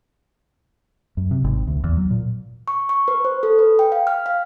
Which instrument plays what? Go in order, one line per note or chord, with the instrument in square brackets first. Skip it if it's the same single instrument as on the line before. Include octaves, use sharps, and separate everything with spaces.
[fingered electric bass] F#2
C3
G#1
D2
E2
F#3
A#2
[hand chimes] C#6
C#6
B4
C5
A4
B4
G5
F5
F6
F5